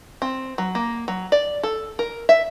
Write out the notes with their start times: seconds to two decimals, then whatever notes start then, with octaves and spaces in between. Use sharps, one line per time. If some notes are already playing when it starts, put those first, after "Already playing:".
0.22 C4
0.58 F#3
0.75 A#3
1.08 F#3
1.32 D5
1.63 A4
1.99 A#4
2.29 E5